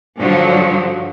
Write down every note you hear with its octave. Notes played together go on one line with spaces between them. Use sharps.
G2 D3 F3 F#3